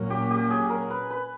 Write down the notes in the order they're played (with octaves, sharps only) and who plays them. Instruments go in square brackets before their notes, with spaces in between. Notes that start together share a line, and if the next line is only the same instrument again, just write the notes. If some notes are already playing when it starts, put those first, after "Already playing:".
Already playing: [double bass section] A#2 F#3 A#3 C#4
[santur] G4
G4
G#4
A#4
B4
B4